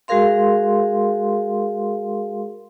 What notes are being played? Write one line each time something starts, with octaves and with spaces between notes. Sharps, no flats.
G#3 F#4 G#4 A#4 F5 C6